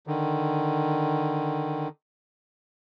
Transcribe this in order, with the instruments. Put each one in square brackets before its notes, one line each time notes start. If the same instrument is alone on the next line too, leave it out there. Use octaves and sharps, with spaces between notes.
[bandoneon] D3 D#3